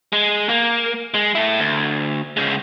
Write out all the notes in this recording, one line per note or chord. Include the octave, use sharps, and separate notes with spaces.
G#3
A#3
G#3
A3 E4
D2
C#3 G#3